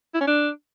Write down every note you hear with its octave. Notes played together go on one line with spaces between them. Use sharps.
E4
C#4
D4